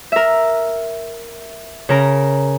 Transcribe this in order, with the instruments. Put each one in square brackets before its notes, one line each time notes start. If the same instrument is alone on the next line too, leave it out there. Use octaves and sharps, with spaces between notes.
[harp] A#4 E5
C#3 A#4 A#5